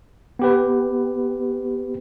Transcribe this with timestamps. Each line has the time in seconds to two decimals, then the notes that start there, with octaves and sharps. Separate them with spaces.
0.39 B3 G4 B4